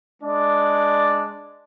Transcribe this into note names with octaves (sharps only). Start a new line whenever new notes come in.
G#3 D4 D5